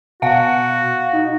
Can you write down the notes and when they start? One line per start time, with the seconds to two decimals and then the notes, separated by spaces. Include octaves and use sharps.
0.22 B2 F#4 F5 F#5
1.13 D#4